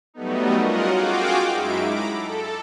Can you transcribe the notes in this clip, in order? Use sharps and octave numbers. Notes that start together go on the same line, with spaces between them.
F#3 G3 A3 B3 D#4
C#4 F4 F#4 A#4 D#5 F#5
F4 F#4 G#4 F5 G5 D6
F#2 G#3 D#4 E4 E5 D7
A#5 B5 D6
A4